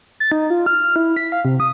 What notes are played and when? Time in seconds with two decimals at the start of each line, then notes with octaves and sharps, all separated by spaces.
0.20 A6
0.32 D#4
0.50 F4
0.66 F6
0.84 F6
0.96 E4
1.17 B6
1.32 F5
1.45 C3
1.60 D#6